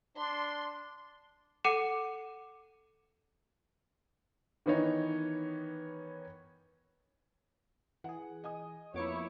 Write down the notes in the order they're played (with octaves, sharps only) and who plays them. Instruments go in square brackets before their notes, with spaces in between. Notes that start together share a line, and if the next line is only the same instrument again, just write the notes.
[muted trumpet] D4 [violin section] C6
[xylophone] A4 F#5 D6 C#7 D#7 E7
[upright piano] D#3 E3 B3 D#4 C#5
[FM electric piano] E3 G#4 [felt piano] F#5
[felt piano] D#5 G#5 D#6
[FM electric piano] F2 D6 C#7 [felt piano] A#3 B3 [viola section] E4 C#5